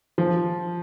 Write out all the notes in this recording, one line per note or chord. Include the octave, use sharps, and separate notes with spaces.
F3